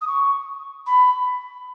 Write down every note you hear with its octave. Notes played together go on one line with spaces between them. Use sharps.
D#6
C#6
B5